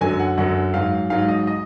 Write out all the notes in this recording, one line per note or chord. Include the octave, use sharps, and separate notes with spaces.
F#2 D3 F#3 G#5
F#5
F#2 D3 F#3 F#5
G#2 F#3 F5
G#2 F#3 F5
D#5
D#5